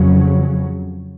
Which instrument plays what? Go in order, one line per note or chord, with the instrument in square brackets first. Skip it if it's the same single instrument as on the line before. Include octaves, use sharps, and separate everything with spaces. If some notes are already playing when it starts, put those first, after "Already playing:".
Already playing: [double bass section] F2 C#3 F#3 C#4